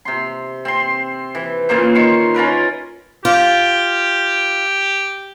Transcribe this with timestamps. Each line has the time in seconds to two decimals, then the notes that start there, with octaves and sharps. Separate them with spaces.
0.05 C3 C6
0.65 C4 C6
1.35 E3
1.69 A#2 C#3 A#3 C5
1.95 D#3 C5 C6 C#6
2.34 C#4 F4 A#4 B4
3.25 F4 G4